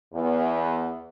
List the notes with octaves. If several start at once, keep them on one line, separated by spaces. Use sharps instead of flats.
E2